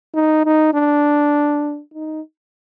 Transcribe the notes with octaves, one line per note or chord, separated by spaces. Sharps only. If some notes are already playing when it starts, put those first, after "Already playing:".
D#4
D#4
D4
D#4